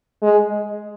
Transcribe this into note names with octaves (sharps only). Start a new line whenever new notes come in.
G#3